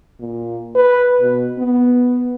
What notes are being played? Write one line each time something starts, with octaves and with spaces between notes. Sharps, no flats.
A#2
B4
B2
B3